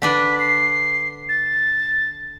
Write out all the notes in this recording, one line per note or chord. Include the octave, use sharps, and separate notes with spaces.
D3 D4 B4 B6
C7
A6